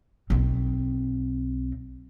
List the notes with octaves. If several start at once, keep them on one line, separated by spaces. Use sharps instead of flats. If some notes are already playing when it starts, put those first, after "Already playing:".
B1 C4